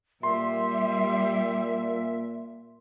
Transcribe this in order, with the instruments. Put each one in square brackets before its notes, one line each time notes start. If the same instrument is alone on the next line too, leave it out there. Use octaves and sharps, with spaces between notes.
[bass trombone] A#2 [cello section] G3 [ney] E5 [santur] C6